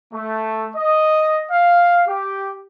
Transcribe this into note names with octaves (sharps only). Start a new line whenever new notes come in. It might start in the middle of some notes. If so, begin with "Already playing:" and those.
A3
D#5
F5
G4